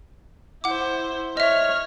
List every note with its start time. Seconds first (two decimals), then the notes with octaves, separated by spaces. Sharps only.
0.64 E4 C5 F#5 D6
1.37 C#5 D#5 E5 F6